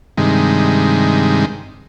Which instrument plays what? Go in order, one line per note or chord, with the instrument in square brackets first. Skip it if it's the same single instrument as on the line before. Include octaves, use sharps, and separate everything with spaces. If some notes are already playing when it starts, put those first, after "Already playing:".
[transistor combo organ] G2 C3 D#3 G#3